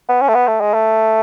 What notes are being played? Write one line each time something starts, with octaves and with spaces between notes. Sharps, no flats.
B3
C#4
A3
B3
A3
G#3
A3